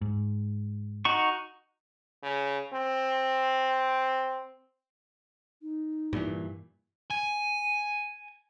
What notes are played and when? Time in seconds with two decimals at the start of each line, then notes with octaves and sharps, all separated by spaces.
0.01 G#2
1.05 D#4 F#4 C#6
2.23 C#3
2.73 C4
5.62 D#4
6.13 G2 A#2 E3
7.10 G#5